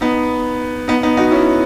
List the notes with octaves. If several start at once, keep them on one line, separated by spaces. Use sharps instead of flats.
B3 D#4
B3 D#4
B3 D#4
D#4 F#4
C#4 E4